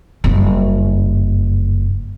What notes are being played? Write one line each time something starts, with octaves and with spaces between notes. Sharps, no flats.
F#1 G2